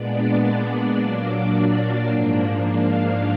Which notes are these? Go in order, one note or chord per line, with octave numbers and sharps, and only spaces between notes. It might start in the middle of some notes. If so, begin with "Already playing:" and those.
Already playing: A#2 G#3 B3 D4 D5
A#2 F#3 A#3 D4
G#2 F3 A#3 D4
F5